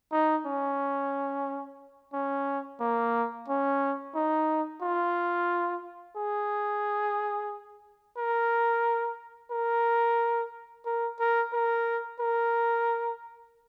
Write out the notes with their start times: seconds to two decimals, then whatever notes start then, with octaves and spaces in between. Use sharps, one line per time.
0.12 D#4
0.46 C#4
2.14 C#4
2.80 A#3
3.48 C#4
4.15 D#4
4.82 F4
6.17 G#4
8.17 A#4
9.51 A#4
10.86 A#4
11.20 A#4
11.53 A#4
12.20 A#4